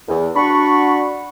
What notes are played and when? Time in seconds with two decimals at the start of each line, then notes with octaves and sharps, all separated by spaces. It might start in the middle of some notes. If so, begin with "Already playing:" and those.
0.08 E2
0.36 D4 F#4 B5 C#6